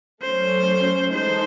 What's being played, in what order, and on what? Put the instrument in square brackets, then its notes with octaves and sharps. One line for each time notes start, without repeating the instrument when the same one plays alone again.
[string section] F#3 A3 C#4 [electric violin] C5
[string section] E3 G#3 D#4 A4 [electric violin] C5